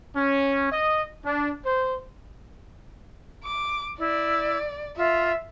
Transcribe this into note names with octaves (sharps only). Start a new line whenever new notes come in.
C#4
D#5
D4
C5
D6
E4 D5
F4 E5